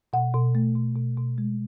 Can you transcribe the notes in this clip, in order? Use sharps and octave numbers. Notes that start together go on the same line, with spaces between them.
B2 F#5
B2
A3
B2
B2
B2
G#3